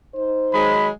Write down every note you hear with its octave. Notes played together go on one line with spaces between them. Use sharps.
D#4 C5
D#3 F#3 G#3 B5